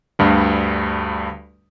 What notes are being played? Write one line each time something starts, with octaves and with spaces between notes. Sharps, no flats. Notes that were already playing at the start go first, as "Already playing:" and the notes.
D2 G2 G3